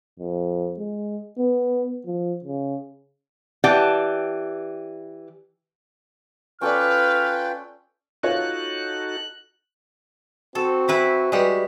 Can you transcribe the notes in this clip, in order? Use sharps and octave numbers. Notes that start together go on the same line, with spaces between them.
F2
G#3
B3
F3
C#3
E3 G4 D5 F#5 A5
C#4 F4 A4 B4 D5 G5 F6
D#4 F4 F#4 A4 C#5 F#6
C4 F#4 A4
E3 E4 B4
G3 G#3 F#4 G4 B4 D#5